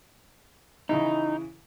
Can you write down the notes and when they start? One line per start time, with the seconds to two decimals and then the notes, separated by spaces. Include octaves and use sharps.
0.89 C#3 E3 D#4 E4